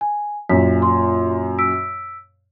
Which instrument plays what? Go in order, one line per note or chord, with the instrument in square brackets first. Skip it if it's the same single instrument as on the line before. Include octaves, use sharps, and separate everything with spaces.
[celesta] G#5
[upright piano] F#2 A#2 [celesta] B6
[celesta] F4 C6
E6 B6 D7